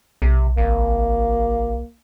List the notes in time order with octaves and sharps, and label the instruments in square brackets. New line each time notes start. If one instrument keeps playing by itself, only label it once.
[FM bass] B1 [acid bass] C3
[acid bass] G#1 [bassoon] A#3